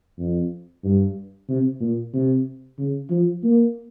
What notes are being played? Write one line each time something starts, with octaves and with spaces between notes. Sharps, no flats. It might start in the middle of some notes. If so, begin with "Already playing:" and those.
F2
G2
C3
A#2
C3
C#3
F3
A#3